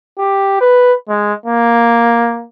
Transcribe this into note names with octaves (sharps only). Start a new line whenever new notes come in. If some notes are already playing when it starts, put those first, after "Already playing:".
G4
B4
G#3
A#3